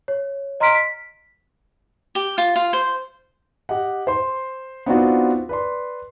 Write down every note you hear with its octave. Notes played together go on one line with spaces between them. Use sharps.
C#5
D#5 A#5 C6 F6 B6 D7
B6
G4
F4
F4
C5
G4 D#5 F#5
C5 C6
B3 C4 D4 D#4 F4 F#4
B4 D5 C6